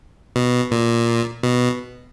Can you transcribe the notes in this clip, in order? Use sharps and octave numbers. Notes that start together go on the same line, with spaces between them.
B2
A#2
B2